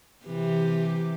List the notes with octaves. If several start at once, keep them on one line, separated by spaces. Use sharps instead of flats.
C3 E3 G4